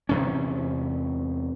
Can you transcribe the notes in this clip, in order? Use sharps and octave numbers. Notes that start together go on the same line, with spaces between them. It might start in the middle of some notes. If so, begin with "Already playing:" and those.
E2 C3 C#4